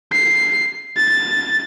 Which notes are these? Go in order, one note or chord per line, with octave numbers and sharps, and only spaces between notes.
C7
A6